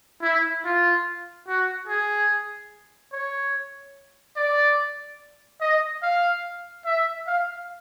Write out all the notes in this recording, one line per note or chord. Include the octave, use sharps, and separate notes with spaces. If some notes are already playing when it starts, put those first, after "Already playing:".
E4
F4
F#4
G#4
C#5
D5
D#5
F5
E5
F5